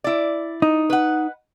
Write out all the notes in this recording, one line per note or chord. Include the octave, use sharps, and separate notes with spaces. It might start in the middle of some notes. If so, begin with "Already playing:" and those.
E4 D5
D#4
B4 F#5